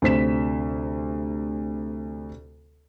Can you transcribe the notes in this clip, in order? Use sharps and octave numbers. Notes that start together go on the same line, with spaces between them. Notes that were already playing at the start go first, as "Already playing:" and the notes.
D2 C3 C5 B6 E7